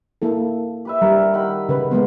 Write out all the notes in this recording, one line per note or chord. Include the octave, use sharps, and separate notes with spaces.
A#3 E4 A4 A5
G4 B4 E5
G3 A#4
D#3 F#5 B5
C#3 B4
G#3 B3 C4 C5